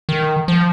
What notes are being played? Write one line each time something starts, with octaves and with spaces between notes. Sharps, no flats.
D#3
F3